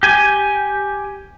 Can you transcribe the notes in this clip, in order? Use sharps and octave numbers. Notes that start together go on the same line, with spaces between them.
G4 G#5